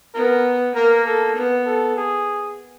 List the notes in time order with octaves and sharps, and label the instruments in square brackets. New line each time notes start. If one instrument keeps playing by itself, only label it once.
[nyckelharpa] B3 [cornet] A#4
[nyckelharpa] A#3 [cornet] A#4
[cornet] A4
[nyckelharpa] B3
[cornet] A4
G#4